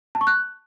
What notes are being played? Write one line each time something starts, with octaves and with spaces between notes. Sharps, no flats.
A5
C#6
F#6